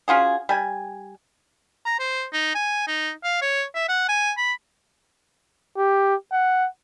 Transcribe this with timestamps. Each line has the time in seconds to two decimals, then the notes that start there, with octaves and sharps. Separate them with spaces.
0.08 C#4 F4 F#4 G#4
0.49 G3 G#5
1.86 A#5
1.99 C5
2.33 D#4
2.55 G#5
2.88 D#4
3.24 F5
3.42 C#5
3.75 E5
3.88 F#5
4.08 G#5
4.37 B5
5.77 G4
6.32 F#5